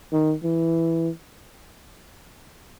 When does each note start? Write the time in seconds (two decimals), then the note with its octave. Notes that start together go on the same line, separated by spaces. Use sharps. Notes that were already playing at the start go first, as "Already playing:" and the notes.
0.12 D#3
0.44 E3